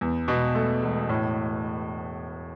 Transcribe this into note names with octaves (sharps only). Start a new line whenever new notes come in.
E2
B2
A3
E1
A2